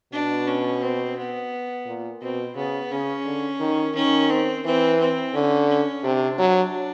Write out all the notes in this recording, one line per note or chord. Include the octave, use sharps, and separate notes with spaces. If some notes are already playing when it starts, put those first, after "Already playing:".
B2 D4
C#4
C4
B3
A#2
B2 C4
C#3 B3
C#3 C#4
D3
D#3
D#3 C#4
C4
E3 C4
C4
D3 C#4
C#4
C3 D4
F#3